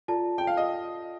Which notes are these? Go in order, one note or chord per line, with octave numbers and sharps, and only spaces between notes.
F4 A4 D5 A5
G5
F5
D#5